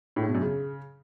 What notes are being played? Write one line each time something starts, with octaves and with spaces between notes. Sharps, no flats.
A2
G#2
B2
F#2
C#3